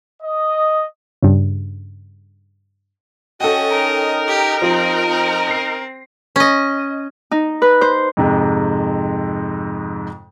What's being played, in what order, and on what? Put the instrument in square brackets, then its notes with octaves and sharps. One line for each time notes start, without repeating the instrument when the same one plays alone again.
[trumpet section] D#5
[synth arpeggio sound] G2 C#3
[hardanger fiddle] C#4 D#5 [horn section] F#4 [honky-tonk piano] A4 G5
[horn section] D#4 A#4
[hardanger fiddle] G4
[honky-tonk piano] F3 [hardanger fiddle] C4
[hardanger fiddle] C4
[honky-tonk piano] A#6 C7
[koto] C#4 D#5
[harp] D#4
B4
C5
[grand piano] F2 G#2 C3 G#3